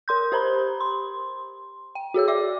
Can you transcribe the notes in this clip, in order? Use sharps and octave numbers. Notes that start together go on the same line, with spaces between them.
A#4 C6 G6
G4 C5 A#5 B5
C6
G5
F#4 G#4 C#5 E6
D5 E5 D6